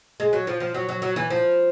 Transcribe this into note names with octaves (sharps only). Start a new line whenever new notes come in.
G#3
F#3
F3
F3
F#3
F#3
F#3
E3
F3